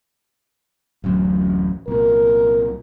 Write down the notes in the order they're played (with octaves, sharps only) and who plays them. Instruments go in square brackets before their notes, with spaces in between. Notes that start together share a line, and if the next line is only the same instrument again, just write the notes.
[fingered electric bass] D1 A1 F#2
[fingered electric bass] C2 A#2 [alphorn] A#4